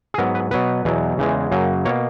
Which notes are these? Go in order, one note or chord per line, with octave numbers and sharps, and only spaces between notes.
G#4
G#2 F#3 B3 A#4
B4
B2 F#3 B3 B4
E2 B2 F#3
E2 C#3 E3 G#3
F#2 C#3 F#3 A#3
B2 A#3 C#5